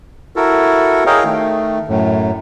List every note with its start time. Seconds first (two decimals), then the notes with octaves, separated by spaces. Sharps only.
0.36 E4 F#4 A4 A#4
1.06 G#4 A#4 C#5 D#5 F5 G5
1.24 D#3 A3
1.88 F#2 A2